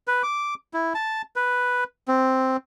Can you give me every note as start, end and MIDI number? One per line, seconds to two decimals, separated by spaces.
0.08 0.23 71
0.23 0.54 86
0.74 0.93 64
0.95 1.22 81
1.36 1.84 71
2.08 2.57 60